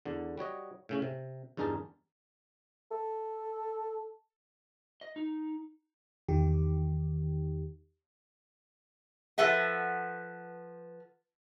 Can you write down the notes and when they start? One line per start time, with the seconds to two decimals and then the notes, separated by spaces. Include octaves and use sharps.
0.05 E2 D3
0.38 G3 F#4 C#5 D#5
0.89 A2 C#3 C#4
1.02 C3
1.57 E2 G2 D#4 G#4 A#4 A5
2.91 A4
5.01 D#5
5.16 D#4
6.28 E2 D#3 G4
9.38 F3 A4 B4 E5 F#5